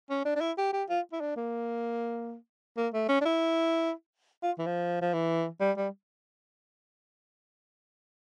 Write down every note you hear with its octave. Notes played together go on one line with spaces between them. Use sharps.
C#4
D4
D4
E4
G4
G4
F4
E4
D4
A#3
A#3
A3
C#4
D4
E4
F4
E3
F3
F3
E3
G3
G3